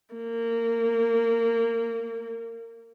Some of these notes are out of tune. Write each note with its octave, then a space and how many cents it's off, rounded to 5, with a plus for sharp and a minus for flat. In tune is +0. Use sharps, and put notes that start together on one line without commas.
A#3 -20